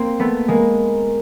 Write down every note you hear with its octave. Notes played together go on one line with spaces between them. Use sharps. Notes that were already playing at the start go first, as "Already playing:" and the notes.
Already playing: A#3 C4
A3 B3
G#3 A#3